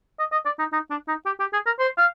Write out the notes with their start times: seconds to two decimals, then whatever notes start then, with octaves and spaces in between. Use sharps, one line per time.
0.19 D#5
0.32 D#5
0.45 D5
0.59 D#4
0.72 D#4
0.90 D4
1.08 D#4
1.26 G4
1.40 G4
1.53 G#4
1.66 A#4
1.79 C5
1.98 F5